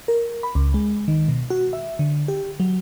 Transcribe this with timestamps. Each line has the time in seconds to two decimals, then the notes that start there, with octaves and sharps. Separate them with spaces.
0.08 A#4
0.43 B5
0.55 C#2
0.74 G#3
1.08 D#3
1.28 B2
1.50 F#4
1.73 E5
1.99 D3
2.28 G4
2.60 F#3